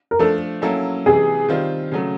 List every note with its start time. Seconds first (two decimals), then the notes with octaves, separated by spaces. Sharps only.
0.11 A#4
0.19 F3 A3 D4 A4
0.62 F#3 A#3 C#4 E4 A4
1.06 C3 E3 G#3 G#4
1.49 D#3 G3 C4 F4
1.92 C#3 F#3 A3